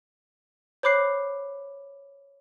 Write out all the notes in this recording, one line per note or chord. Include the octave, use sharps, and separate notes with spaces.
C5 C#5 B5 D6 F#6 C7